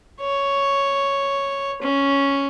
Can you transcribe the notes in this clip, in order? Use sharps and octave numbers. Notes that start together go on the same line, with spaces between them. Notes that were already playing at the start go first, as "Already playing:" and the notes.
C#5
C#4